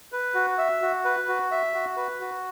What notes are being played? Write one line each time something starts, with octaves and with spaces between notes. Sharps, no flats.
B4
F#4
E5
F#4
B4
F#4
E5
F#4
B4
F#4